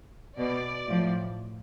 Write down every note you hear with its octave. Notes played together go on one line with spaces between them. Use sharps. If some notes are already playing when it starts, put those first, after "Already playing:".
B2 D5
A2 F3